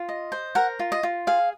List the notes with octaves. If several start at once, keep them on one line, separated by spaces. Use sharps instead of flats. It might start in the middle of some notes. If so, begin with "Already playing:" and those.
Already playing: F4
D#5
C5
A#4 F#5
F4
D#5
F4
G#4 F5